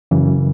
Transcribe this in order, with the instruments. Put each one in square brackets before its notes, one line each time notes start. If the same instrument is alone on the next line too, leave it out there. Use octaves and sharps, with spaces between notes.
[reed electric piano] F#2 C#3 E3